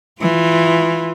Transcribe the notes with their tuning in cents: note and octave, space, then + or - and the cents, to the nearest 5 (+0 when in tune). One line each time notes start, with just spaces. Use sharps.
E3 +0 F4 +10